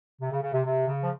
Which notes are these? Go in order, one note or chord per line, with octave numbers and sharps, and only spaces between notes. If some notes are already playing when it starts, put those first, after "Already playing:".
C3
C#3
C#3
C3
C3
C#3
F3